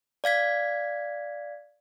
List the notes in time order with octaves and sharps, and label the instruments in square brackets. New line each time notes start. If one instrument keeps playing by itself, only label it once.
[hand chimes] D5 F5 G#6 B6